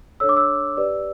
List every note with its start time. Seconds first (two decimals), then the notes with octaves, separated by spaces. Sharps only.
0.20 D4 A4 C#5 E6
0.29 D6
0.37 E6
0.77 G4 B4 D5